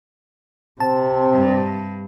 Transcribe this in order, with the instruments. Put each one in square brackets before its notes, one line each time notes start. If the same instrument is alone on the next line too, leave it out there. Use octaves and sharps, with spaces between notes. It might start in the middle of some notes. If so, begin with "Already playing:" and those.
[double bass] C3 [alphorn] C4 [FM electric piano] A5
[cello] G2